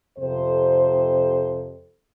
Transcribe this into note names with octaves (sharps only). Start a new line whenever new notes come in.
F2 C3 A4 C5